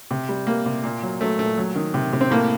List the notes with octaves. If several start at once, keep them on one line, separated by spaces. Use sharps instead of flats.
C3
G3
G3 A#3
C3
A#2
F#3
F#3 A3
A#2 A3
F#3
D#3
C3
C3
C4
A2 A#3